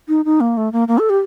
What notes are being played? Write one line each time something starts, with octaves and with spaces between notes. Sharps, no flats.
D#4
D#4
A#3
A3
A#3
A#3
A4
G4